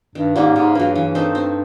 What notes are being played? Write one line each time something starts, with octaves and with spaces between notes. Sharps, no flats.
G2 D#3
G#2 G3 A#3 C#4
G#2 C#3
G2 F#3 A#3
G2 E3
A3 C4 D#4
C4